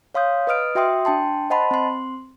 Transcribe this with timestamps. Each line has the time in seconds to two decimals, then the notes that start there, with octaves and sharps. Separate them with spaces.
0.15 C#5 F5 C6 D#6 G6
0.47 B4 D#5 D#6 F6 D7
0.75 F#4 E5 G5 C6 D#6
1.05 D4 G5 A5 C6
1.50 C5 D#5 F#5 A5 B5 C6
1.71 C4 C6